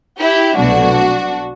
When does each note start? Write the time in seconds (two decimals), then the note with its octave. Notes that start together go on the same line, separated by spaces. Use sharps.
0.21 E4 G4
0.57 C2 B2 F#3 A3 D4 F#4